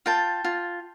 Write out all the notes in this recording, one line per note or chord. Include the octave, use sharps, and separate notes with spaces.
F4 G5 A5
F4